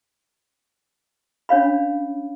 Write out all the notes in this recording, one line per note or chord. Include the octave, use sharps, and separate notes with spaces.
C#4 D4 C#5 F5 B5